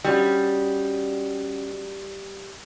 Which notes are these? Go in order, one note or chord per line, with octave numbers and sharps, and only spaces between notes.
G3 C#4 F#4 D#5